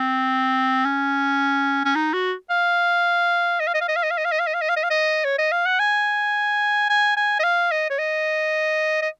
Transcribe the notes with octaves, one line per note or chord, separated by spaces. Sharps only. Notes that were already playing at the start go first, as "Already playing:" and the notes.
Already playing: C4
C#4
C#4
D#4
F#4
F5
D#5
F5
D#5
F5
D#5
F5
D#5
F5
D#5
F5
D#5
F5
D#5
F5
D#5
F5
D#5
F5
D#5
C#5
D#5
F5
F#5
G#5
G#5
G#5
D#5
F5
D#5
C#5
D#5
D#5